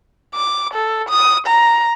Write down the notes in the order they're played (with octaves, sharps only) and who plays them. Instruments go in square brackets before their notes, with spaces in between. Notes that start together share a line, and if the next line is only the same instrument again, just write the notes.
[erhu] D6
A4
D#6
A#5